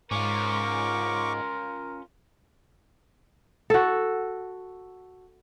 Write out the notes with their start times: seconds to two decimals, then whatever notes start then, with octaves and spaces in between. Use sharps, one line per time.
0.11 G#2 C#4 F4 A#4 C#6 D6
3.70 F#4 A4